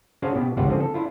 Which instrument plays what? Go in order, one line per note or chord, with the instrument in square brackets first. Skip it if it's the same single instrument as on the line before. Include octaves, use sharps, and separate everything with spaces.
[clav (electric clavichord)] C#4 D4 F#4 G#4 C5 F5
B2 B3 G4
G#1 C#2 G3 F4 G4 F#5
D3 F3 C4 G#4
A4
D4 E4 F4